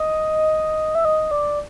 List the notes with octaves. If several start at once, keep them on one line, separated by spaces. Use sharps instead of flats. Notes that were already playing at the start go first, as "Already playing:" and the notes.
Already playing: D#5
E5
D#5
D5